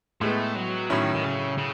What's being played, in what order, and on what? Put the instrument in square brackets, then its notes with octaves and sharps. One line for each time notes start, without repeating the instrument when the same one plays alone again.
[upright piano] A2 G#3 B3 [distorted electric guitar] A3
[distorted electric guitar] F#3
[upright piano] A2 F#3 C#4 E4 [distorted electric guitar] D#3
[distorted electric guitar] D#3
C#3
C#3